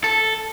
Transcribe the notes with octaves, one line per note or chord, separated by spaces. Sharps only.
A4